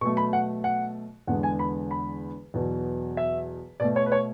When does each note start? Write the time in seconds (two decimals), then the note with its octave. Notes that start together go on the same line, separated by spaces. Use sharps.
0.01 B2 F#3 A3 C#6
0.17 B5
0.33 F#5
0.64 F#5
1.27 E2 D3 G#3 B3 F#5
1.43 G#5
1.59 B5
1.91 B5
2.54 E2 B2 F#3
3.17 E5
3.80 B2 A3 D5
3.96 C#5
4.06 B4
4.12 C#5